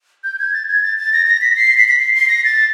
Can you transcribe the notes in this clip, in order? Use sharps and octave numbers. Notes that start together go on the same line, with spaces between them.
G6
G#6
A6
G#6
A6
A6
A#6
A#6
B6
C7
B6
B6
C7
C7
A#6
A6